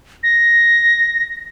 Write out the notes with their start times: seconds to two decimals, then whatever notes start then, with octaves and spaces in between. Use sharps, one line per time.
0.23 A#6